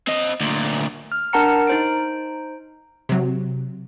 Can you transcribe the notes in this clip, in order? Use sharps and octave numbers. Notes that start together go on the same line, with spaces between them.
C4 D#5
D2 A#2
F6
D4 A#4 F#5 A5 A#5 C#7
D#4 C5 D7
C3 F#3